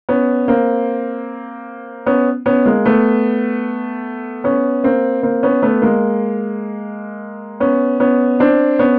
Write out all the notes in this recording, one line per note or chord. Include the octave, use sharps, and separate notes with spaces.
B3 C#4
A#3 C4
B3 C#4
B3 C#4
G#3 A#3
A3 B3
B3 C#4
A#3 C4
A#3 C4
B3 C#4
A3 B3
G#3 A#3
B3 C#4
B3 C#4
C4 D4
B3 C#4